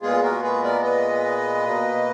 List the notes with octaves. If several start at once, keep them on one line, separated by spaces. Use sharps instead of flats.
A#2 G#3 B3 F4 G#4
F#4 A#4
G#4 B4
A#4 D5
B4 D#5
B2 A#3